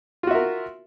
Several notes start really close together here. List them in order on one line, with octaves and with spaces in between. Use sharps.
F4 F#4 E5 A#4